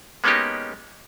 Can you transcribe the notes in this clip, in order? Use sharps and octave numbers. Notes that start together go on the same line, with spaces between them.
G#3 A#3 B3 C#4 D#4 G4